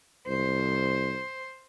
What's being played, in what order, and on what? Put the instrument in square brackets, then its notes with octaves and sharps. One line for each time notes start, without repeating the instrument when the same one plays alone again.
[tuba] C2 [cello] C5